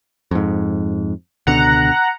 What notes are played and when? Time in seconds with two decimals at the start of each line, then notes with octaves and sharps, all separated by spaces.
0.31 F2 G#2
1.47 C#2 B2 D3 F#5 A#5